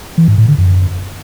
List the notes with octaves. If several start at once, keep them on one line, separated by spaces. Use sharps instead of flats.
E3
G#2
A2
D3
F#2